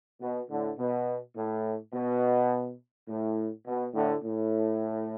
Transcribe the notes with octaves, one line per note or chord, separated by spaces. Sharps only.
B2
A2 D3
B2
A2
B2
A2
B2
A2 D3
A2